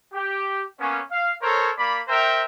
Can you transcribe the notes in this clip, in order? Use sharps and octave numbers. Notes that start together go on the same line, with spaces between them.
G4
A#3 B3 C#4
F5
A4 A#4 C5 C#5
A#3 D5 B5
A#4 C5 E5 G5 A#5